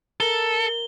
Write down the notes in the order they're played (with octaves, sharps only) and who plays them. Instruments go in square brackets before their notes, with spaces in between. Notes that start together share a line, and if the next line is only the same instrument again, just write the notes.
[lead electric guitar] A4 [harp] A#4 A#5 [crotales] G7